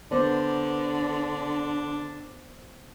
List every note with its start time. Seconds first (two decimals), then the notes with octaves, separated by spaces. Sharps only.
0.11 D3 B3 D4 C5 D5